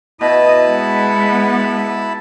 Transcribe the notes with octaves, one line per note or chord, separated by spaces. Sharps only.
B2 E4 D#5 A5 B5
G#3 B3